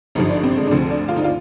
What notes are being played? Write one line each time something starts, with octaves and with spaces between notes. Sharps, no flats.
G#1 G2 D3 F3 D#4
D4
C4
G#3
D4
D2 D3 F3 C4
D4
F4
D#4
F4